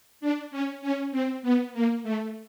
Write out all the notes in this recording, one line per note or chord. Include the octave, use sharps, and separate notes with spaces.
D4
C#4
C#4
C4
B3
A#3
A3